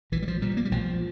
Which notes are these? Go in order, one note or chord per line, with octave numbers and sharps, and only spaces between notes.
A#1 E3
G3
F3
A#2 G3
A#3
G3
A#1 F3